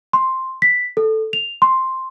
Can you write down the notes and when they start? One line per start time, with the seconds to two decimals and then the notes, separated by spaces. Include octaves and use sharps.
0.13 C6
0.62 B6
0.97 A4
1.33 F7
1.62 C6